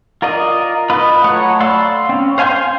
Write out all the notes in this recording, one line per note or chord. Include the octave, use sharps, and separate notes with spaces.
F4 A#4 D5 D#5
F4 B4 D#5 B5
F#3 A3 C#5 F#5 F#6
D5 F5 B5 C6 E6
C4 C#4
C5 F5 G#5 C6 G6